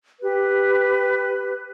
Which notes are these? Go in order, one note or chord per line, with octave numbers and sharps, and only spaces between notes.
G4 B4